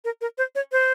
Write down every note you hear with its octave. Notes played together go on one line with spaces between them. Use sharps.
A#4
A#4
C5
C#5
C5